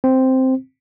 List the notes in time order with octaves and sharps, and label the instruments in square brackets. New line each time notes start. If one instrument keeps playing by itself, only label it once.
[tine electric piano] C4